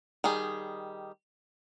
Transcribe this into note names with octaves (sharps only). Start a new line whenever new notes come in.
D#3 G3 G#4